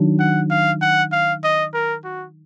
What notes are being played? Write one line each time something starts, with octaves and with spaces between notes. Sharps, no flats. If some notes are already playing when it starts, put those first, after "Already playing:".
Already playing: D#3 F#3 D4
F#5
F5
F#5
F5
D#5
A#4
F#4